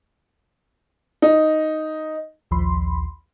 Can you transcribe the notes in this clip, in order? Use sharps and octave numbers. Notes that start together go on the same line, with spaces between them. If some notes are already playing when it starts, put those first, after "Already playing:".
D#4
A#1 D#2 F3 B5 C6